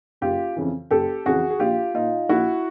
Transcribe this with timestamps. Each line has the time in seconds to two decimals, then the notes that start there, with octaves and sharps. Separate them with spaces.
0.21 F#1 F4 G4
0.56 F2 C#3 E3
0.91 F#1 G4 A4
1.26 F2 C#3 E3 F#4 G#4
1.50 G#4
1.59 A#1 F4 G4
1.94 A#2 D#4 F4
2.29 A#1 E4 F#4